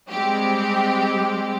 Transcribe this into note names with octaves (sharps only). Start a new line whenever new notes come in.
G3 G#3 C4 G4